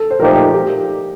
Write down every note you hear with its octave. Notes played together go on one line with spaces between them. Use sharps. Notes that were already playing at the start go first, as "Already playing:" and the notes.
Already playing: A4
C5
A#2 F3 A3 D#4 G4 A#4
G4